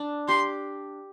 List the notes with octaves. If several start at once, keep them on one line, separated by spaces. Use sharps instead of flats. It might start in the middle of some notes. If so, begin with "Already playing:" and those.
Already playing: D4
G4 C6